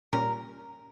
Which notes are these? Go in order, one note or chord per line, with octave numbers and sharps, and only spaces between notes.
A#2 G3 C#4 A#4